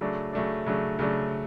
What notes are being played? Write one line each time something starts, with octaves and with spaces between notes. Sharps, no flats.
C#3 F#3 A3 D4
C#3 F#3 A3 D4
C#3 F#3 A3 D4
C#3 F#3 A3 D4